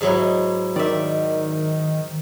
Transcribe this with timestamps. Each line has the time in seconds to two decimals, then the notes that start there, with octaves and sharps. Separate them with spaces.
0.01 G#2 F#3 E4
0.76 D#3 D5 E5